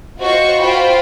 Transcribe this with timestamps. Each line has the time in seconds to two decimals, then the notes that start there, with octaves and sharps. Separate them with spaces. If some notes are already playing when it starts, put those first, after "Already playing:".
0.20 F4 F#4 C5 D#5 C#6
0.61 F4 C5 G5 B5